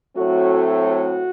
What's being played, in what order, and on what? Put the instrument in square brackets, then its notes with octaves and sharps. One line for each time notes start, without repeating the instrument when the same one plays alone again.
[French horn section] A2 F#3 A3 C4 F#4
F#4